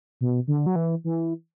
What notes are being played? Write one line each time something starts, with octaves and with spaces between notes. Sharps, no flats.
B2
D3
F#3
E3
E3